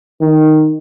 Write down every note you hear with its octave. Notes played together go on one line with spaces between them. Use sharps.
D#3